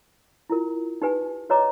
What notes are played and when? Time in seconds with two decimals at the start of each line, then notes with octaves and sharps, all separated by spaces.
0.50 E4 F4 A#4
1.02 D#4 G4 B4 G#5
1.49 F#4 B4 C#5 D#5 A#5 D6